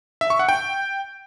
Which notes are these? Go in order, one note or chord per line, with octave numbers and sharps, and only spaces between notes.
E5
C#6
F#5
G5